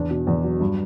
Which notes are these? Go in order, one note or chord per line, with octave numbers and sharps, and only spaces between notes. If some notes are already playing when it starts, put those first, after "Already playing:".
Already playing: E2 D4
B2
E2
F#3
G2